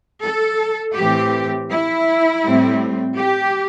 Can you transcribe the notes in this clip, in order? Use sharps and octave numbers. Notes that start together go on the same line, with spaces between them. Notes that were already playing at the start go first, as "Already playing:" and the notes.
A4
A2 E3 C4 G4
E4
A2 G3 C4
G4